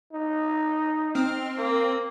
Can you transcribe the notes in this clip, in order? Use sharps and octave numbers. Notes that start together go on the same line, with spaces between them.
D#4
C4 F6
A#3